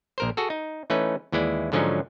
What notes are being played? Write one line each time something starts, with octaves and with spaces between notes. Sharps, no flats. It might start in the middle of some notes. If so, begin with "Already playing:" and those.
A#1 A#4 C5
F#4 G#4 A4
D#4
E3 A3 C#4 D#4 B4
D#2 E3 G#3 E4 D5
G#2 D3 F3 F#3 C#4 D#4